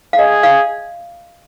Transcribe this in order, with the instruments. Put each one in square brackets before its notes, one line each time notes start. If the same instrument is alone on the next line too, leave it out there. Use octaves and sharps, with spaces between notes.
[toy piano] F5
[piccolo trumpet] G#4 [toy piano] D#5
[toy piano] F5